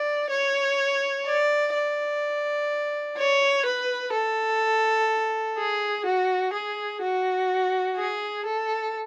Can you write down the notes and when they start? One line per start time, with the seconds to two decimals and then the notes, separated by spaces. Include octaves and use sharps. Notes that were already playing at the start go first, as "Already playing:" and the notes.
Already playing: D5
0.30 C#5
1.26 D5
1.74 D5
3.17 C#5
3.65 B4
4.13 A4
5.58 G#4
6.05 F#4
6.53 G#4
7.01 F#4
7.97 G#4
8.46 A4